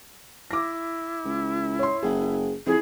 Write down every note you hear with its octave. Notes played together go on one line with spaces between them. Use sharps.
E4 D6 A#6
C#2
C#5 C6
F#1 G#4
F2 E4 G#4